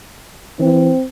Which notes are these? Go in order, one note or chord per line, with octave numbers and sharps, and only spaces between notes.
E3 C4